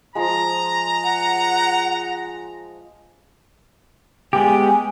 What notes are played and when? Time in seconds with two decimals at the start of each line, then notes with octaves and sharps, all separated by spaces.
0.15 F3 G#3 A#5
1.04 F#5
4.33 G#3 B3 G4 G#5